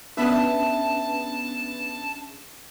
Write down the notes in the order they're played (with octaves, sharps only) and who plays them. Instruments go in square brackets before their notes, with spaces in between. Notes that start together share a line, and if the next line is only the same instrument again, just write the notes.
[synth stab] B3 B4 [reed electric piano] C#4 D4 [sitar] G#4 E5 [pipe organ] A5